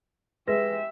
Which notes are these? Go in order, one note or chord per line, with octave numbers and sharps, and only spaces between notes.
G#3 G4 B4 E5 A#6